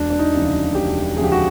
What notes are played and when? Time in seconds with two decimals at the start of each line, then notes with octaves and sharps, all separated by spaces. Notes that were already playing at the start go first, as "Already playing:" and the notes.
Already playing: E1 D4
0.10 D4
0.19 D#4
0.34 D2 C#3 F3
0.75 E1 G4
1.17 D2 G#4
1.19 C#3 F3 G4
1.32 F#4